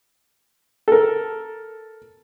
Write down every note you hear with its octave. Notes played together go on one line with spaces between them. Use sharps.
A4 A#4